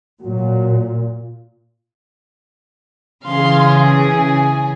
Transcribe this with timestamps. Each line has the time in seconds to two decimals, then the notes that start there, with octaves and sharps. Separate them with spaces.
0.22 A#2 F#3 F#4
3.24 C#3 E3 G#4 F5 C6
3.82 G#5